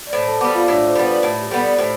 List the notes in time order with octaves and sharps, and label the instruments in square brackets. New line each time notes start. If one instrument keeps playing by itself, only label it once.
[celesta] D5
[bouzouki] A2 [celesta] C5
[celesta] A4 A5
[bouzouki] B3 [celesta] D5 D6
[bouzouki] G3
[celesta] F4 F5
[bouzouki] A2 [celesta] D4 D5
[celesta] C5
[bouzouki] G3 B3
[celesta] B4
[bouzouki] A2 [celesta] G4
[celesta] G4
[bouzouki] G3 B3 [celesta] A4
[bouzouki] A2 [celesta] C5